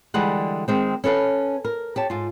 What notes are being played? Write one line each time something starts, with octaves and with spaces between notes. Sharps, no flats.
D3 E3 G3 G#3 F#5
D#3 G#3 C4
C#4 A4 B4 F5
A#4
G4 C#5 A5
G#2 F4